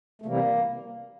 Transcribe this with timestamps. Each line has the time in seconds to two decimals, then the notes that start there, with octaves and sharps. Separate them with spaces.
0.22 A3
0.25 C3 E3 G3 A#3